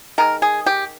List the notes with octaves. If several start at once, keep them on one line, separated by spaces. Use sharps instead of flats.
D#3 G#3 A#4
G#4
G4